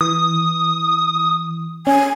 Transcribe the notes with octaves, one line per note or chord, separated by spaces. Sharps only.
E3 D#6
C#4 G#5